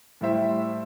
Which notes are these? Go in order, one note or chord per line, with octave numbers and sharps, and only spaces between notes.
A2 G3 E4 C5 E5